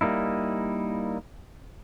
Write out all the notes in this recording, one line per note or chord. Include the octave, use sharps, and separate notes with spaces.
G3 A#3 D#4 E4